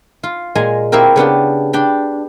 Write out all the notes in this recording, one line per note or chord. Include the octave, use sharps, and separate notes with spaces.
F4
A#2 G#3 G#5 A#5
A#3 C4 E4 G4 A#4
C#3 B3 D4 G4
D4 G5 B5